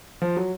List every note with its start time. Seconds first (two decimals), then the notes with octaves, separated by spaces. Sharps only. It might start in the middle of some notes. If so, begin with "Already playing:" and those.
0.22 F3
0.37 F#3